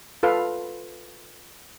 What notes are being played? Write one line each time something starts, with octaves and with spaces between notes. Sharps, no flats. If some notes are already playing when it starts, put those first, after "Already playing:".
F4 A4 B4 F5